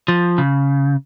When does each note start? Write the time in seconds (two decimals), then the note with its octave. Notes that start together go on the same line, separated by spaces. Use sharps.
0.08 F3
0.38 C#3